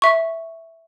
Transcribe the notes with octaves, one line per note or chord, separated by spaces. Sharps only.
E5 C#6